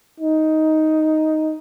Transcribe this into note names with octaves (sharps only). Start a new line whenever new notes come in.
D#4